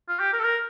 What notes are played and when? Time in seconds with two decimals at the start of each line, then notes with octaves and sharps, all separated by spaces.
0.09 F4
0.20 G4
0.33 A#4
0.40 A4
0.44 A#4